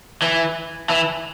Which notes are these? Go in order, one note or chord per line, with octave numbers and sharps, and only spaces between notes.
E3
E3